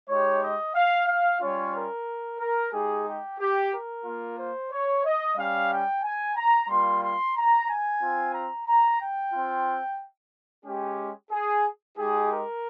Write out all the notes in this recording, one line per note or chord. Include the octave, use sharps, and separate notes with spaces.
G#3 D#4 G4 C#5
D#5
F5
F5
G3 C#4 F4 C#5
A#4
A#4
G#3 D#4 G4 G#4
G4
G4
A#4
A#3 F4
C5
C#5
D#5
G3 C#4 G4 F5
G5
G#5
A#5
G3 A#3 F4 C6
C6
A#5
G#5
C4 F4
A#5
A#5
G5
C4 F4
G#3 C#4 G4
G#4
G#3 D#4 G4 G#4
A#4